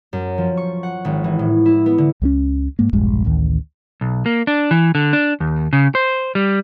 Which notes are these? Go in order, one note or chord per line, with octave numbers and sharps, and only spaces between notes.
F#2
F3
C#6
F#5
G#1
E3
A2
E4
B3
D3
C#2 G3 C#4
G#2 G#3 A#3
E1 A#1 G2 G#3
A1 D2 D#3
B1
A#3
D4
E3
D3
D4
D#2
C#3
C5
G3